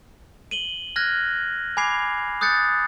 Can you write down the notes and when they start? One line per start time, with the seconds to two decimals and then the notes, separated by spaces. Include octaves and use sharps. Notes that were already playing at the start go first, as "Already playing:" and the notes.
0.51 D#7 F#7 G7
0.96 F6 F#6 G#6 A#6
1.77 G#5 B5 D6 G#6 C7 F7
2.41 D#6 F#6 G6 A6 C#7